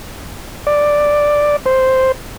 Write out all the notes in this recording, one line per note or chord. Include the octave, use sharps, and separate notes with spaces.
D5
C5